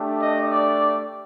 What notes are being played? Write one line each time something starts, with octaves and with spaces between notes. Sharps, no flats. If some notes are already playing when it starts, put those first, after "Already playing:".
Already playing: A3 D4 G4
D#5
D5